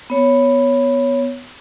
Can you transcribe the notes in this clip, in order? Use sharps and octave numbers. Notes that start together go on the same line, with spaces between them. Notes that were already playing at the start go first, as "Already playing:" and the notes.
B3 C#5